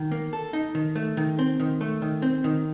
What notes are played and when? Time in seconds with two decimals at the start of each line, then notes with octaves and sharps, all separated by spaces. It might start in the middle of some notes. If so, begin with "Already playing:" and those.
Already playing: D#3
0.12 A#3
0.33 A4
0.53 D#4
0.75 D#3
0.95 A3
1.17 D#3
1.39 C4
1.60 D#3
1.81 A3
2.02 D#3
2.22 C4
2.44 D#3